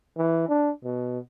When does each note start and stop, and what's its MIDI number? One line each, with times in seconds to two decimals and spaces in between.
0.17 0.46 52
0.49 0.70 62
0.84 1.19 47